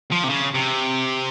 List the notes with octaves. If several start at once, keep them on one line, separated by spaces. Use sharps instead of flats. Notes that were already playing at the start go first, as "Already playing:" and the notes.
F3
C3
C#3
C3